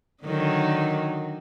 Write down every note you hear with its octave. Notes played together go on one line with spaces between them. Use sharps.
D3 D#3 F#3